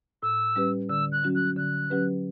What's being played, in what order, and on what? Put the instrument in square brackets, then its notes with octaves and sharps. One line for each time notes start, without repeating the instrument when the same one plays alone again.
[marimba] A2 [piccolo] E6
[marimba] G3 C#4 G4 B4
[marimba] D3 [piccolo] E6
[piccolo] F#6
[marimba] F#3 C#4 F#4
[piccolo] F#6
[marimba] D3 [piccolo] F#6
[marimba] F#3 C#4 G4 B4